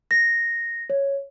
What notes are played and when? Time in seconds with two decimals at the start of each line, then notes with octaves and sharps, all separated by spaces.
0.11 A#6
0.90 C#5